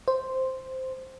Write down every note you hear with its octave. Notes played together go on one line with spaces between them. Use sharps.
C5